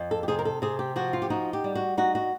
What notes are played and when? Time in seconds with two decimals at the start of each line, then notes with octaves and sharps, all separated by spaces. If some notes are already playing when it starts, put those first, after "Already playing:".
Already playing: F2
0.11 A4
0.23 G4
0.28 C3 G#4
0.39 A#4
0.45 A4
0.62 C3 G#4
0.79 G4
0.96 F3 F#4
1.13 F4
1.22 G4
1.30 D#4 F#4
1.53 G4
1.64 G3
1.75 F#4
1.98 D#4 F#4
2.15 F#4